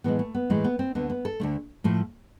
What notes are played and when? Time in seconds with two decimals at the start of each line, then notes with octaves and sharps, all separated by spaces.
0.04 A2 E3 G#3 B3
0.19 A3
0.34 B3
0.50 A2 E3 G#3 A3
0.64 B3
0.79 C4
0.95 D2 D3 A3 B3
1.10 B3
1.25 A4
1.40 D2 D3 A3
1.84 A2 F3 A3